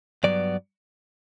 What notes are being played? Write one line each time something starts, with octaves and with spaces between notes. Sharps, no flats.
G2 F#3 B3 D5